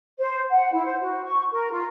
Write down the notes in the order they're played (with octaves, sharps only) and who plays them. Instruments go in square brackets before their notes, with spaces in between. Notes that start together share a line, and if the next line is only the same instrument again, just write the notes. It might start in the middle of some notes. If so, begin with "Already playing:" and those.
[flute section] C5
F#5
E4
C5
F#4
C#6
A#4
F4